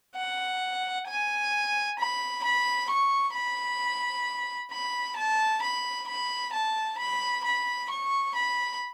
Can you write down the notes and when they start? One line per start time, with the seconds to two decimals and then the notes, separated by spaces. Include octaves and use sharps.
0.16 F#5
1.08 G#5
1.99 B5
2.44 B5
2.89 C#6
3.34 B5
4.71 B5
5.16 A5
5.62 B5
6.08 B5
6.53 A5
6.98 B5
7.44 B5
7.90 C#6
8.35 B5